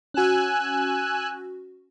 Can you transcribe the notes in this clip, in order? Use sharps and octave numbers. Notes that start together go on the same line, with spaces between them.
C#4 F#4 G#5 E6 F#6